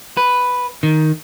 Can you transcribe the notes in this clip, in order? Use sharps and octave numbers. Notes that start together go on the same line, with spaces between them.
B4
D#3